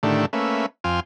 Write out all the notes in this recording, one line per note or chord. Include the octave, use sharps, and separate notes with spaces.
A2 D3 D#3 A3 D4 G4
A3 A#3 C#4 B4 E5
F2 F4 C5 G5 G#5 F6